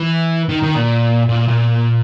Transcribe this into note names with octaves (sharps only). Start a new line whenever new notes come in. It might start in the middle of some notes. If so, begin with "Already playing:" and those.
Already playing: E3
D#3
D#3
A#2
A#2
A#2